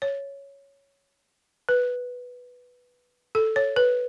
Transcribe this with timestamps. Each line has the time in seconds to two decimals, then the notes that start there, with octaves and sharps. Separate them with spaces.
0.02 C#5
1.69 B4
3.35 A4
3.56 C#5
3.76 B4